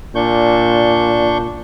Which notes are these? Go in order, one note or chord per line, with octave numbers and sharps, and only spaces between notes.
A#2 D4 C#6 G6